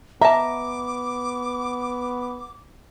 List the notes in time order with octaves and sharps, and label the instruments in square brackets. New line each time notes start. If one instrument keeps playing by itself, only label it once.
[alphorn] B3 [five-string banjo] E5 A5 [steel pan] A#5 [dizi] D6